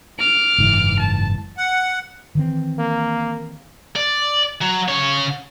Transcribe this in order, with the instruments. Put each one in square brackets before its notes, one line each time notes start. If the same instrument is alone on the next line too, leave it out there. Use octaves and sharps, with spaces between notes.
[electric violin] D6 F6
[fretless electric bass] F#1 G#2 E3
[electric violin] A5
[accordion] F#5
[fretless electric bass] D#3 E3 C4
[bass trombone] A#3
[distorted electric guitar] D5
F#3
C#3 C#5